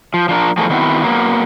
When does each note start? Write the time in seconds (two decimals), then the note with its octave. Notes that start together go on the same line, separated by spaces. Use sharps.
0.14 F3
0.29 F3 D4 A#4
0.58 E2 F3 A3 G#4 A#4
0.70 D#3 F#3 B3 C4 E4 F#4
1.02 F#3 A#3 B3